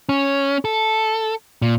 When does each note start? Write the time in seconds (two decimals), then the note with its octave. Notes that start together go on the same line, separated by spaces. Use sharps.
0.09 C#4
0.65 A4
1.62 A#2